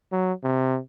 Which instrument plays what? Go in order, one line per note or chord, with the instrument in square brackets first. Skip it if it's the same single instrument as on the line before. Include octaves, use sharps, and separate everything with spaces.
[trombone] F#3
C3